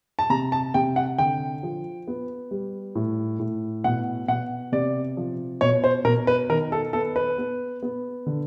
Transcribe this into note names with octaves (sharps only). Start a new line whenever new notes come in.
A5
C3 A#5
A5
C3 G5
F#5
D3 G5
F3
B3
G3
A2
A2
B2 F#5
B2 F#5
C3 D5
F3
B2 C#5
C5
B2 A#4
B4
D#3 A#4
A4
B3 A4
B4
B3
B3
D3